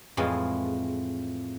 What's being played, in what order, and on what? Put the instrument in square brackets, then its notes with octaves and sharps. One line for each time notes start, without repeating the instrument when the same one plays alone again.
[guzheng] F2 A2 E3 G#3 F4